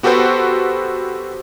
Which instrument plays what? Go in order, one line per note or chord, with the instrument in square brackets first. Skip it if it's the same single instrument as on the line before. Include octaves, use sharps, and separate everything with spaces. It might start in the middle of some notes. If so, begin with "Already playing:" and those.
[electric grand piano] B3 F#4 G4 A4 B4 C5